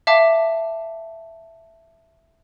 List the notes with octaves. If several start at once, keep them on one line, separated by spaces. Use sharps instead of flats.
E5 F5 A5 D6